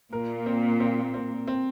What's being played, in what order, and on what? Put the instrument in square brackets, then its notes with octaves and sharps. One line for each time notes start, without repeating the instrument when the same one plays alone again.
[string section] A#2 [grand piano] A#4
[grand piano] C4
C4
C4
C4